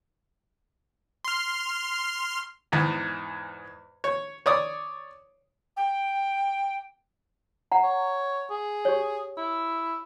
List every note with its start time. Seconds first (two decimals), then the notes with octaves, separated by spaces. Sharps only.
1.24 C6 F6
2.72 E2 G#2
4.04 C#5
4.46 C#5 D5 D#6
5.77 G5
7.72 F#5 A#5
7.84 C#5
8.51 G#4
8.85 G4 C#5
9.38 E4